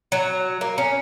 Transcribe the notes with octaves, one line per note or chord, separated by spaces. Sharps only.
F#3
A#3
C#4